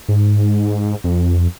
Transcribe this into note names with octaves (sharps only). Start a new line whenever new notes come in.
G#2
F2